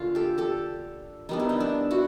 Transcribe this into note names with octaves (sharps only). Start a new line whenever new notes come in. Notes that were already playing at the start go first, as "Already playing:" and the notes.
Already playing: D3 A#3 C#4 F4
G4 A4
G4 A4
D#3 G3 B3 D4 D#4
E4
D#4
D4 E4
E4 F#4